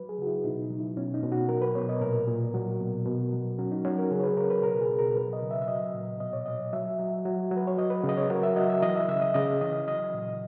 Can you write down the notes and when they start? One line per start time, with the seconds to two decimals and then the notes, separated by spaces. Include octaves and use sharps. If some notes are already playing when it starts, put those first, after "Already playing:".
Already playing: F#3 B4
0.09 G#4
0.18 C#3 F#4
0.27 E4
0.44 B2 D#4
0.62 D#4
0.70 F#3
0.79 E4
0.97 B2 C#4
1.14 D#4
1.23 B2
1.32 F#4
1.49 F#3 A#4
1.62 B4
1.75 B2 C#5
1.89 D#5
2.01 A#2 A#4
2.28 A#2
2.54 F#3
2.80 B2
3.06 B2
3.33 F#3
3.58 F#3 C#4
3.72 D#4
3.85 F#3 C#4
3.98 A#4
4.11 C#3 G#4
4.20 C#5
4.24 B4
4.37 C#3 A#4
4.50 B4
4.63 B2 A#4
4.81 G#4
4.90 B2
4.99 A#4
5.16 F#3 B4
5.33 D#5
5.42 C#3
5.51 E5
5.62 E5
5.68 F#3 D#5
5.94 A#2
6.20 B2 D#5
6.33 C#5
6.46 F#3 D#5
6.73 F#3 E5
6.99 F#3
7.25 F#3
7.51 F#3
7.57 B4
7.67 C#5
7.77 F#3 D#5
7.90 B4
8.04 C#3
8.09 D#5
8.17 C#5
8.30 F#3 A#4
8.43 E5
8.56 F#3 D#5
8.70 E5
8.82 E3 D#5
8.96 E5
9.08 C#3 E5
9.22 D#5
9.34 C#3 D#5
9.61 E3 D#5
9.87 F#3 D#5
10.14 A#2